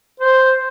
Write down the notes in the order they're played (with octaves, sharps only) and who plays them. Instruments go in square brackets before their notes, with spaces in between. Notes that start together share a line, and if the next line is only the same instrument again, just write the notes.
[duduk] C5